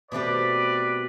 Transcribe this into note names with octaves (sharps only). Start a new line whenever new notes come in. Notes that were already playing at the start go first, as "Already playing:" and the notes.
B2 A3 C4 G4 B4 D5